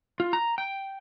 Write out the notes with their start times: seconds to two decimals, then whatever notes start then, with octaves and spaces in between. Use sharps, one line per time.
0.20 F4
0.33 A#5
0.58 G5